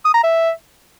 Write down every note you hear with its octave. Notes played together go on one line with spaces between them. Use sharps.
D#6
A#5
E5